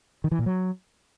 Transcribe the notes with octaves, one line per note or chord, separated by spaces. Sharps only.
D#3
E3
A#2
F#3